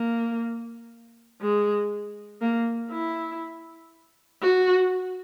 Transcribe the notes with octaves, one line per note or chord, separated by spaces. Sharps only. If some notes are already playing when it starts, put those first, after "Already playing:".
Already playing: A#3
G#3
A#3
E4
F#4